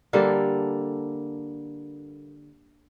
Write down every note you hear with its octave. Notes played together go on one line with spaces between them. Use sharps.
D3 G3 A#3 A4